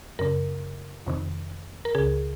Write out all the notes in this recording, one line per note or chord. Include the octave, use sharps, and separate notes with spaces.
F#2 C#3 A#4
F2 C3 D#3
A#4
C#2 C#3 G#4